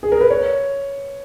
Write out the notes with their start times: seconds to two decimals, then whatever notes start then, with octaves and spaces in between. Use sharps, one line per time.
0.03 G#4
0.12 A#4
0.21 B4
0.30 C#5